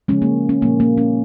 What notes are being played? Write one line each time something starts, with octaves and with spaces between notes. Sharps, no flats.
C#3 F3 G#3 C#4
A#3
C#4
A#2 F3 A#3
A#3
C#4